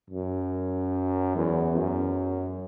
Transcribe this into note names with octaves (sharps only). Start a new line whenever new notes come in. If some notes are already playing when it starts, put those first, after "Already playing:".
F#2
E2
F#2